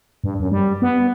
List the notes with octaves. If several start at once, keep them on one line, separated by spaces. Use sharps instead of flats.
G2
F#2
G3
B3